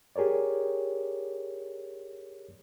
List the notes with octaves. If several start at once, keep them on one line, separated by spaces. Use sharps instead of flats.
G4 G#4 A#4 C#5 D5